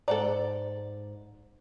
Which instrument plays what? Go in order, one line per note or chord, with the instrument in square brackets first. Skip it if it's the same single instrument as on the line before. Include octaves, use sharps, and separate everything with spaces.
[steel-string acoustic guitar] G#2 [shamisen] A4 F#5 A#5 [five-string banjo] D5